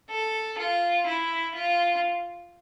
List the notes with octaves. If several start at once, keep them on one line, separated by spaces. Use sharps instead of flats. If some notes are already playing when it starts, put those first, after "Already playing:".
A4
F4
E4
F4